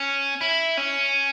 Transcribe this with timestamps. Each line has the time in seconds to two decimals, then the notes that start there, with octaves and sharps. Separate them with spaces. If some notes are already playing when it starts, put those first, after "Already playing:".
Already playing: C#4
0.41 E4
0.77 C#4